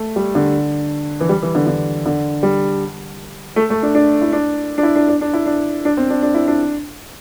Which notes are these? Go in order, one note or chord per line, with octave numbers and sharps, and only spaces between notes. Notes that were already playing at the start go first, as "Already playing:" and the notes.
Already playing: A3
G3
D3
E3
G3
E3
D3
D3
D3
G3
A3
A3
D4
D4
E4
D4
D4
E4
D4
D4
D4
E4
D4
D4
C4
D4
D4
E4
D4